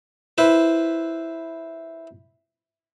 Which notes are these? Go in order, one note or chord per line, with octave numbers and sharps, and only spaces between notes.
E4 B4 C5